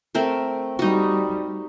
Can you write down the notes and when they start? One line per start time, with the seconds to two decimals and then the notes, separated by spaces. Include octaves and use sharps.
0.15 A3 C4 A#4
0.79 G3 D#4 F#4